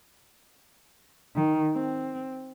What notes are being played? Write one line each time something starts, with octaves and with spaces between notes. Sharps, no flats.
D#3
C4